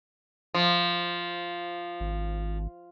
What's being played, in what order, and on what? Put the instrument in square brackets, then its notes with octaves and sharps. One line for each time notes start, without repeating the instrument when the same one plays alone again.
[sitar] F3
[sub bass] G#1